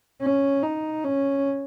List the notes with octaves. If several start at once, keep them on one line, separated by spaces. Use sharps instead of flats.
C#4
D#4
C#4